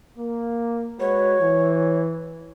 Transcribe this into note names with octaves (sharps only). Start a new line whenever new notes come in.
A#3
G#3 F#4 B4 C#5
E3